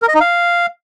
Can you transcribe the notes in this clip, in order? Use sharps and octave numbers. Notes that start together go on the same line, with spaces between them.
A#4
D#5
D#4
F5